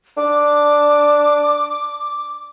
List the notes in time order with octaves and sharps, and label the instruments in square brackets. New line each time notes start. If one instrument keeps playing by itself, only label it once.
[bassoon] D4 [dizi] D6